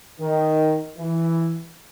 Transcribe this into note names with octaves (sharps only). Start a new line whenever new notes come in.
D#3
E3